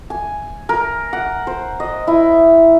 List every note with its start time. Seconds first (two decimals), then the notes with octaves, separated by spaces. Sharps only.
0.10 G#5
0.69 A#4
1.13 F#5
1.47 C5
1.80 D#5
2.07 E4